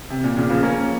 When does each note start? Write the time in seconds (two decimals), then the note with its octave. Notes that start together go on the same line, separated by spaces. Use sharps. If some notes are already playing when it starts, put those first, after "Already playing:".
0.10 C3
0.24 A#2
0.37 A#2 C#3
0.50 C#3 F3
0.63 A#3 C#4